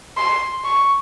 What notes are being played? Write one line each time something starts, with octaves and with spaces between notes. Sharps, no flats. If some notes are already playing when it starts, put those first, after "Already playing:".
C6
C#6